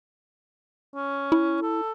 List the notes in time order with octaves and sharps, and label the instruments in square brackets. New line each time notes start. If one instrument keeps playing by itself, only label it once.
[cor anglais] C#4
[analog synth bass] E4
[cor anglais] A4